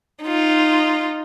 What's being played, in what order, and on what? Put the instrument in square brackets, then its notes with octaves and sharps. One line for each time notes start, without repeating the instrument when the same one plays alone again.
[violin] D#4 F4